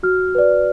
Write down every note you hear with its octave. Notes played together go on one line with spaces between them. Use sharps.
F#4 F6
B4 D5